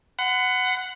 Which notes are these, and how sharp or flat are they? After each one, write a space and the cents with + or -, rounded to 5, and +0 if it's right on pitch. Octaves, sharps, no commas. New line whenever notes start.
F#5 +0 B5 +45